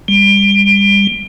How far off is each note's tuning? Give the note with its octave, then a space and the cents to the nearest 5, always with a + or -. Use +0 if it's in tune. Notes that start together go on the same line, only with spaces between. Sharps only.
G3 +30